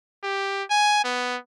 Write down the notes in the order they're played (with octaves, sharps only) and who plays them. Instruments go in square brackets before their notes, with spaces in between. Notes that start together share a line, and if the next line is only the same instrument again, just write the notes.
[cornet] G4
G#5
B3